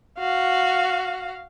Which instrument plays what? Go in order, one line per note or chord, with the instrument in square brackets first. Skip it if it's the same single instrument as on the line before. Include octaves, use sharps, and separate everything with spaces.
[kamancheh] F#4 F5